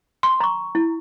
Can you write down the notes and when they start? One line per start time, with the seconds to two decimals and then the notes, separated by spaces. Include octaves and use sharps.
0.23 C6
0.40 A#5 C#6
0.75 E4